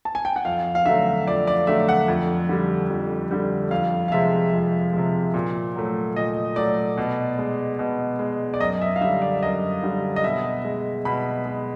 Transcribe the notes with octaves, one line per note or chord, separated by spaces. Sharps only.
A5
G#5
G5
F#5
F2 F5
F5
D3 F#3 A3 E5
F2 D5
D5
D3 F#3 A3 E5
F#5
F2
D3 G3
F2
D3 G3
F2 F5
F5
C3 F3 G#3 E5
F2
C3 F3 G#3
A#2
F#3 A3
A#2 D#5
F#3 A3 D5
B2
G#3
B2
G#3
D5
F#2 D#5
E5
F5
D3 G3 E5
D5
F#2 D#5
D3 G3
D#5
B2 E5
G#3
B2 B5
G#3